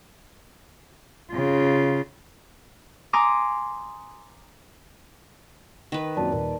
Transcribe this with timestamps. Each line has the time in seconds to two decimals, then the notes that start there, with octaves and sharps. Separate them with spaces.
1.32 C#3 F4
3.13 G#5 A#5 C6 D6 D#6
5.92 D#3 A#4 B4
6.17 F#2 A#2 C4 D5 A5
6.32 D#1 A#4 D5 A5